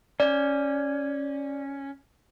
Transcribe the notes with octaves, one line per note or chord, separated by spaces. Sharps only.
C#4 D5